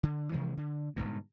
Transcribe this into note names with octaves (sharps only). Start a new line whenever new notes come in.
D3
C3 E3 F3 G#3
D3
G1 D2 G#2 B2